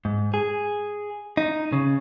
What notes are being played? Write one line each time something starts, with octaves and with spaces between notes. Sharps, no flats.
G#2
G#4
D#4
C#3